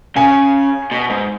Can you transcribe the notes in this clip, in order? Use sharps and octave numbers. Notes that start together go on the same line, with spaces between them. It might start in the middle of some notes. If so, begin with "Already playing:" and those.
C#3 G#5
B2
G#2